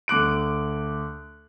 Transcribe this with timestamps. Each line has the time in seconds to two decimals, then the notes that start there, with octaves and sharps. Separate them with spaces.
0.08 D2 D6 F#6 D7